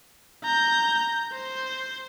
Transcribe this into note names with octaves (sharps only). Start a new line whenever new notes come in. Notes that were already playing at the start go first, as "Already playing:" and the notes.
A#5 G6
C5